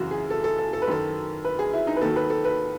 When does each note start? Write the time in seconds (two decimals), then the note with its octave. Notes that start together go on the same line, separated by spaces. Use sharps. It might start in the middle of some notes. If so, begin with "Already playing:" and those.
Already playing: F#2 C#3 E3 F#4
0.11 G#4
0.30 A4
0.44 A4
0.58 A4
0.73 A4
0.82 B4
0.87 F#2 D#3 F#3 A4
1.45 B4
1.59 G#4
1.73 E4
1.87 D#4
1.96 B4
2.01 D#2 D#3 F#3 A4
2.16 B4
2.30 A4
2.45 B4